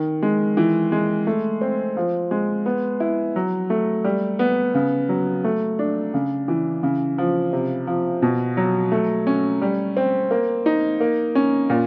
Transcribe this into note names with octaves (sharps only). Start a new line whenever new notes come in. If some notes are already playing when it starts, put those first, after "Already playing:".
Already playing: D#3
G#3
E3
G#3
A3
C4
F3
G#3
B3
E4
F#3
A3
G3
B3
C#3
F#3
A3
D4
C#3
E3
C#3
F3
C3
F3
B2
F#3
A3
C#4
G3
C4
A#3
D#4
A#3
C#4
A#2